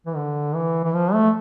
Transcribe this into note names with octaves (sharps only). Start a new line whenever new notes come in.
E3
D3
E3
E3
F3
A3